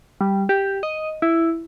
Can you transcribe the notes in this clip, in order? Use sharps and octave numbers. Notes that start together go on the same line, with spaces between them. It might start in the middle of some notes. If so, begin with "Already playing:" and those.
G3
G4
D#5
E4